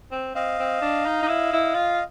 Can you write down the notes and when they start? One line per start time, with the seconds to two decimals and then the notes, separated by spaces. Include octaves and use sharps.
0.12 C4
0.35 C4 D#5 F5
0.59 C4
0.81 D4
1.06 D#4
1.22 D#4
1.28 E4
1.53 E4
1.75 F4